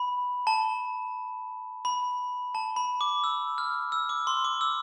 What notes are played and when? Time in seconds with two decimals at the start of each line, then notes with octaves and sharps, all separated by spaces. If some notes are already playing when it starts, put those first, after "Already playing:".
Already playing: B5
0.47 A5
1.85 B5
2.55 A5
2.76 B5
3.01 D6
3.24 E6
3.58 F6
3.92 E6
4.09 D6
4.27 C6
4.44 D6
4.61 E6